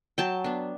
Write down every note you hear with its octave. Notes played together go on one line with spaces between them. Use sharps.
F#3 G5 A5
B3 D4